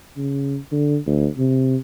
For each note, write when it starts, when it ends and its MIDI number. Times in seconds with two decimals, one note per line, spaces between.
0.17 0.58 49
0.72 0.97 50
1.06 1.27 38
1.38 1.76 48